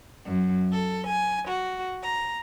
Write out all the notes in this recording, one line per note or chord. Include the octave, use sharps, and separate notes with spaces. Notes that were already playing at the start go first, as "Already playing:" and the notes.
F#2
A4
G#5
F#4
A#5